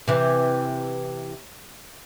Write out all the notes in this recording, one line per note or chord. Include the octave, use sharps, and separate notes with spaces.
C3 E3